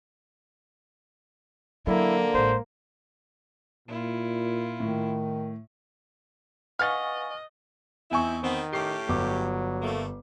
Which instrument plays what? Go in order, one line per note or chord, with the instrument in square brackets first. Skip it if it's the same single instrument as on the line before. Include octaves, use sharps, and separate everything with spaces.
[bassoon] D3 [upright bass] F#3 [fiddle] A#3 [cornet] E4
[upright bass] A1 G#3 [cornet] C5
[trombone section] A#2 [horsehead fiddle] E4 F4
[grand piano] A2 [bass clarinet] D#3
[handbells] B4 F#5 [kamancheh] D#5 [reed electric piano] F5 G#5 C#6 [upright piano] F6 A6
[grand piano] E2 G#5 C#6 [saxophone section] C4 D#4 E4
[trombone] D#3 [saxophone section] B3 C4
[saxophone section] A2 C#4 G4 [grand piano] C7
[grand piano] G1 D6 [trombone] F#3
[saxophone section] A3 A#3